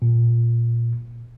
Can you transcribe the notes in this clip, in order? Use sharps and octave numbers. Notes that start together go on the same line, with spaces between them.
A#2